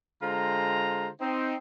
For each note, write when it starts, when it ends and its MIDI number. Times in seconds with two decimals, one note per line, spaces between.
0.22 1.08 50
0.22 1.08 56
0.22 1.08 65
0.22 1.08 72
0.22 1.08 82
1.20 1.55 60
1.20 1.55 63